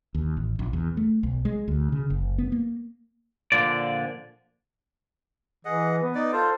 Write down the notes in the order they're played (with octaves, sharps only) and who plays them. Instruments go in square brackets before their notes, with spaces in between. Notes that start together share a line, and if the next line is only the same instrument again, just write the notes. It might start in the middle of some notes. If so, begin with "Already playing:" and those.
[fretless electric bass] D#2
A1
A#1
E2
A3
B1
G#3
D2
C#3
F#1
B3
A#3
[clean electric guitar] A#2 D3 F3 D5
[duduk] E3 [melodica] G#4 D#5 F#5
[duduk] B3
[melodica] D#4 D5
[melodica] F4 C5 [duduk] A4